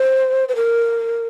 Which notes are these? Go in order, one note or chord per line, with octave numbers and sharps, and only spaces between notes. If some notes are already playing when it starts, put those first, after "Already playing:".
Already playing: C5
C5
A#4